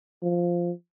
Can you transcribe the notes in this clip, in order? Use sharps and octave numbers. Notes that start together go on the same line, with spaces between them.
F3